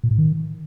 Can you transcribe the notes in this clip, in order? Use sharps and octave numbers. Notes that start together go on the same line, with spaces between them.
A#2
A2
D#3